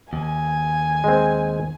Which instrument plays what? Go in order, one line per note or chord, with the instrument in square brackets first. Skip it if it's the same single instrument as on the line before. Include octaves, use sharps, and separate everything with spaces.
[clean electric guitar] D#2 [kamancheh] G#5
[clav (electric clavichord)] G#3 C4